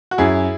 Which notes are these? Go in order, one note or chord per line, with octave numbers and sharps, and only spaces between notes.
F#4
F#2 E4 G#4